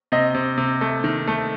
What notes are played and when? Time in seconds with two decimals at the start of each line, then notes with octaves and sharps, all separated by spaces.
0.12 C3 D#5
0.34 C3
0.58 C3
0.81 A3
1.04 D#3
1.28 A3